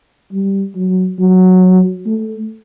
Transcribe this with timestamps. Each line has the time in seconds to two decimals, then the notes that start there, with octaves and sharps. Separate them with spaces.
0.32 G3
0.75 F#3
1.19 F#3
2.06 A3